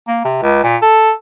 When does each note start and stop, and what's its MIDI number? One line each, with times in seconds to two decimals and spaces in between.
0.08 0.20 58
0.25 0.41 48
0.42 0.61 37
0.63 0.77 46
0.82 1.11 69